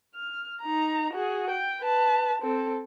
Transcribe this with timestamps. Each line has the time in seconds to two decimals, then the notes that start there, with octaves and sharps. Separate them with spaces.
0.15 F6
0.61 D#4 A#5
1.13 F#4 G#4
1.50 G5
1.82 B4 A5
2.42 C4 A4